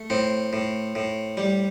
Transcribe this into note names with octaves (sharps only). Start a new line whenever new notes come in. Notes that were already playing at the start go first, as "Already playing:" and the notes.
Already playing: A3
A2 C4
A2
A2
G3